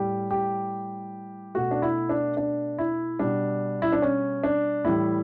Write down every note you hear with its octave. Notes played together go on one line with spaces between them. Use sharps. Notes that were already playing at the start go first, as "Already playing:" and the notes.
Already playing: A2 G3 G4
G4
B2 A3 F#4
D4
E4
D4
D4
E4
B2 G3 D4
E4
D4
C#4
D4
A2 E3 G3 E4